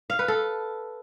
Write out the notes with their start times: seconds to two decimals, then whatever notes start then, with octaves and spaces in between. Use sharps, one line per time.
0.10 F5
0.19 B4
0.28 A4